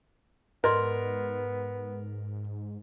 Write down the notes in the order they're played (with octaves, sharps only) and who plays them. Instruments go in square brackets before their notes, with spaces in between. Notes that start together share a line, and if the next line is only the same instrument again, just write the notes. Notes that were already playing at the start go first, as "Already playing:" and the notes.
[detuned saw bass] G#2 [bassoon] B3 [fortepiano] A#4 [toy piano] D5 D#5 C6